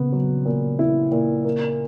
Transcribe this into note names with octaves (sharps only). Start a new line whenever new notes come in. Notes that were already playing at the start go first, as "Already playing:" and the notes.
Already playing: A#2 C#3 B3
F#3
A#2
E4
A#2
A#3